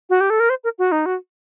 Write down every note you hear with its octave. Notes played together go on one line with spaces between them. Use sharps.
F#4
G4
A4
A#4
C5
A#4
F#4
D#4
F#4